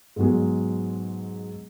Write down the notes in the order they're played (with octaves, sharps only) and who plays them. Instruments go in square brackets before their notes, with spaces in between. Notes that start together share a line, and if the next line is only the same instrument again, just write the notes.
[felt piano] G#2 B2 F#3 G#3